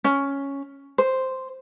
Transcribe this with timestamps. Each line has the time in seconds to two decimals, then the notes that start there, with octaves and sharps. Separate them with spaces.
0.04 C#4
0.98 C5